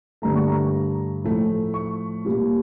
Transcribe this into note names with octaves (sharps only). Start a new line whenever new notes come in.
G2 D3 A3 A#5
C#6
A#5
A2 F3 A3
C#6
A#2 G3 A#3